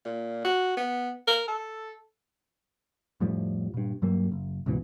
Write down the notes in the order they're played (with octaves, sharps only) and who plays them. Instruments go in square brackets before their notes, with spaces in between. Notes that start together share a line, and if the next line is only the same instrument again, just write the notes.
[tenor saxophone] A#2
F#4
B3
A#4
A4
[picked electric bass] F2 A2 F3 G3
G2 A#2
G2 F#3 G3 A#3
F#1
C#2 G#2 B2 E3